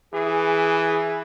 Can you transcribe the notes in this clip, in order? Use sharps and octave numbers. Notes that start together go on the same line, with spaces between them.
E3 G#4